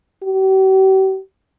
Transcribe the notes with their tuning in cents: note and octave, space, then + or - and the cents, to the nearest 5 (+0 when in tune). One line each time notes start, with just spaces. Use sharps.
G4 -45